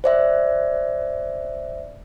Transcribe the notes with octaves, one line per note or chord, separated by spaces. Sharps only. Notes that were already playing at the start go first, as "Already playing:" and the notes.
C5 D5 E5